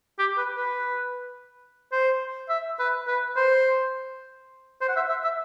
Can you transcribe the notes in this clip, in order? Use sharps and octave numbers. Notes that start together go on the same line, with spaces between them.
G4
B4
B4
C5
E5
B4
B4
C5
C5
F#5
E5
E5
E5